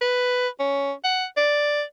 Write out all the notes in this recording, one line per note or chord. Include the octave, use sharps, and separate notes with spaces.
B4
C#4
F#5
D5